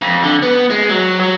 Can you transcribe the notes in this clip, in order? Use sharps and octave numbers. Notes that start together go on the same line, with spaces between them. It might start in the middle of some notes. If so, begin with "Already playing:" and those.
F2
D3
B3
G#3
F#3
F#3